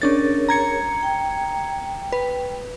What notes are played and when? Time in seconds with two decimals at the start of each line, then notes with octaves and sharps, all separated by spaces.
0.02 C#4 D4 G#4 A#4 C#5 A6
0.49 A#5 G#6 C#7
1.03 G5
2.12 B4